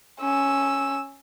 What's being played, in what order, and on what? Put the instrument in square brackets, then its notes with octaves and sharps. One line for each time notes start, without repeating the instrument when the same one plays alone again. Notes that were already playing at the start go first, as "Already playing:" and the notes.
[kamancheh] C#4 E6